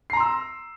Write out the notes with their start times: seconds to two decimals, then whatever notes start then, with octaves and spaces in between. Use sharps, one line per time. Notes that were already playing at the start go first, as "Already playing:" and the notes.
0.10 C7
0.13 A#5
0.17 C6
0.20 E6